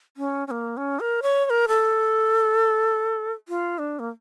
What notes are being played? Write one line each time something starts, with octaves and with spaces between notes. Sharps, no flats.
C#4
C#4
A#3
C#4
A#4
C#5
C#5
A#4
A4
F4
D4
A#3